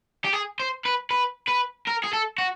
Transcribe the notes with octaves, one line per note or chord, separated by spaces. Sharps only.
G4
G#4
C5
B4
B4
B4
A#4
G#4
A4
F#4